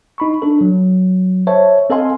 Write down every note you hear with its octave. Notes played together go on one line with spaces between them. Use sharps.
D#4 B5 C#6
D4 A4
F#3
C5 C#5 E5 A5
C4 A4 D#5 F5 G#5 C6